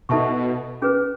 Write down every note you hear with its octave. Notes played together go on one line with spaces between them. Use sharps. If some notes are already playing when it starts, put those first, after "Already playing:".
B2 D#4 A4 E5 A5 C#6
C#4 G#4 B4